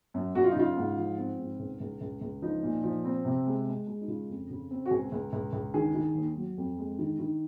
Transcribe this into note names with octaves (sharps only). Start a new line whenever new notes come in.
F#2
F#2 F#4
F4
D#4
C#3 F4
G#2
F3
C4
G#2
C#2
C#2
C#2
C#2
F3 D#4
A#2
F3
C4
C3
G#3
G#3
G#3
D#4
C#3 F4
F2
C#3
C4
F#4
C#2 G#4
C#2
C#2
C#2
D#3 G#4
D#3
D#2
F#3
F2
G#3
D#3
D#3